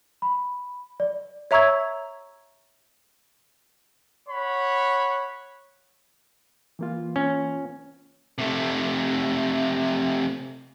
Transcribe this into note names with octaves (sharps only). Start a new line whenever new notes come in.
B5
D5
C#5 E5 A#5 C#6 E6 G#6
C#5 F#5 B5
E3 A#3 F4
C#4
C3 A3